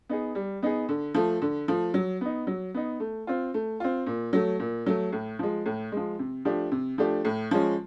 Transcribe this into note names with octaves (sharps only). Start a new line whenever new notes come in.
B3 D#4 G#4
G3
B3 D#4 G#4
D3
F3 A3
D3
F3 A3
F#3
B3 D#4
F#3
B3 D#4
A3
C4 F4
A3
C4 F4
A#2
F#3 A3
A#2
F#3 A3
A2
F3 G#3
A2
F3 G#3
C3
F3 A3 D4 G4
C3
F3 A3 D4 G4
A2
F3 G#3 C#4